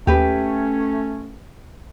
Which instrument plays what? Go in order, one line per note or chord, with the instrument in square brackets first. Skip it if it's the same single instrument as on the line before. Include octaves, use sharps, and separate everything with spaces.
[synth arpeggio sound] D#2 [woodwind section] A3 C#4 [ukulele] G4 B4